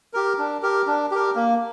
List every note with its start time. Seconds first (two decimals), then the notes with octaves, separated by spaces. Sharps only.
0.14 G4 A#4
0.38 D4
0.63 G4 A#4
0.87 D4
1.11 G4 A#4
1.35 A#3